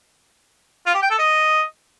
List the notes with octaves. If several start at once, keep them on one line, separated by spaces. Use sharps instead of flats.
F4
G4
G5
A4
D#5